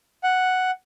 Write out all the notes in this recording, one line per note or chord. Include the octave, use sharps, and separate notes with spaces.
F#5